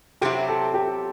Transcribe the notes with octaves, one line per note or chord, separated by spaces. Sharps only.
C3 F#3 C4 E4 G4
A4
G4